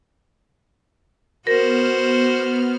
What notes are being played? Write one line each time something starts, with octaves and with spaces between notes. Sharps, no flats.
B3 F#4 A#4 C5 F6